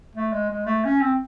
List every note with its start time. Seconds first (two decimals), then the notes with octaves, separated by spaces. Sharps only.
0.15 A3
0.33 G#3
0.50 G#3
0.66 A3
0.84 C#4
1.01 C4